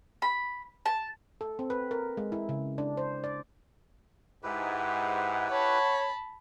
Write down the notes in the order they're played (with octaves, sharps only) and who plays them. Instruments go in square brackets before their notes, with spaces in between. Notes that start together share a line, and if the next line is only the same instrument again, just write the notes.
[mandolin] B5
A5
[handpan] A4
C4
B4
A#4
G#3
E4
C#3
D4
C5
D5
[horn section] G#2 [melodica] E4 G4 B4 [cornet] F#5
[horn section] C#5 [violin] A5 B5